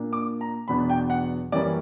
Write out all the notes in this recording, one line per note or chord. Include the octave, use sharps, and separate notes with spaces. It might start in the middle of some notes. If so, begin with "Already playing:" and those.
Already playing: A#2 A#3 D4
D6
A#5
E2 B2 F#3 B3 D4 B5
G5
F#5
F#2 E3 G3 A#3 C#4 D5